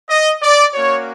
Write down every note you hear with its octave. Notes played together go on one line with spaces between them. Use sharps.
D#5
D5
A#3 C#4 F#4 C#5